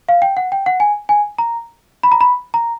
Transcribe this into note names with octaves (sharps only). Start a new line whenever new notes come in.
F5
G5
F#5
G5
F#5
G#5
G#5
A#5
B5
A#5
B5
A#5